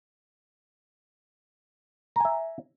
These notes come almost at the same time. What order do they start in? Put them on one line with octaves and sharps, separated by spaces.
A#5 G#5 E5